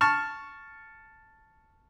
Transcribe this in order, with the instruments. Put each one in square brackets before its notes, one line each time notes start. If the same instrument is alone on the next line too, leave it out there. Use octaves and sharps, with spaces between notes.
[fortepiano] A5 C#6 F6